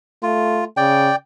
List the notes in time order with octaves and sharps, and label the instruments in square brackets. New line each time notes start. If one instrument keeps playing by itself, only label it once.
[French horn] A3 [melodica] F4
[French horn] C#3 [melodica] D5 G5